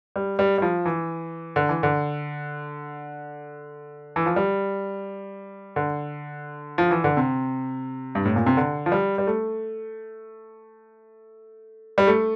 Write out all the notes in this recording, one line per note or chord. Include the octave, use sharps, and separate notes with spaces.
G3
G3
G3
F3
E3
D3
E3
D3
E3
F3
G3
D3
F3
E3
D3
C3
G2
A2
A#2
C3
D3
F3
G3
G3
A3
G3
A3